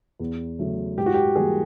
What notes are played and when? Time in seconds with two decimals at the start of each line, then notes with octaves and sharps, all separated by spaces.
0.19 E2
0.59 C#3 F#3 A3
0.98 G#2 G4
1.06 F#4
1.14 G4
1.36 E3 G3 A#3 G#4